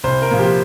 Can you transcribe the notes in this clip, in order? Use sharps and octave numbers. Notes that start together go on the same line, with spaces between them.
C2 C5
A#4
A#2 F3
G4